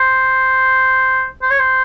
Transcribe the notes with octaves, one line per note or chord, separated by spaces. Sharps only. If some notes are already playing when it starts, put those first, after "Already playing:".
Already playing: C5
C5
C#5
C5